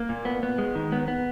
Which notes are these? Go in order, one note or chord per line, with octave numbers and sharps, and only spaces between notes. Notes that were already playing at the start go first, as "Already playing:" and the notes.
Already playing: A#3
A#2
B3
B3
G#3
D#3
B3
B3